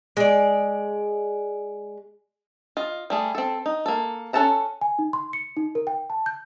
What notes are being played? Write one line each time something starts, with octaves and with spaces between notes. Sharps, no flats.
G#3 D5
F4 D#5
G3 A3 G#4
C4 A4
D#4
A#3 A4
C#4 A4 F#5 A5 A#5
G#5
D#4
C6
C#7
D#4
A#4
G5
A5
G6